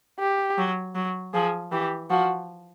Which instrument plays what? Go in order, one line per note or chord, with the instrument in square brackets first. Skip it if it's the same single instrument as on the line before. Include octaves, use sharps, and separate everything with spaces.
[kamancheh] G4
[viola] F#3
F#3
[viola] F3 [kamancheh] G#4
[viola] E3 [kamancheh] G4
[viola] F3 [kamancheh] F#4